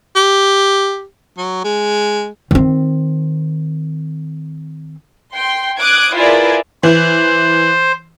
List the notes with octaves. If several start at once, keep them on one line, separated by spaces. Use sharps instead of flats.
G4
F#3
G#3
D#3 C4
G5 C6
D6 D#6 F#6 G#6 D7
E4 F4 G#4 A#4 B4 D5
E3 C5